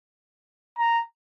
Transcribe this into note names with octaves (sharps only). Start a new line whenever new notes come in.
A#5